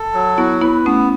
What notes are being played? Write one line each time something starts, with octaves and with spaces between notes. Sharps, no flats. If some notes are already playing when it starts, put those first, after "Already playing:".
Already playing: A4
F#3
B3 E4 F#4
B3 E4 B4
A3 B3 C#4